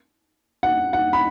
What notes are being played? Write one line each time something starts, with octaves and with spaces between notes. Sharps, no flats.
F#5
F#5
B5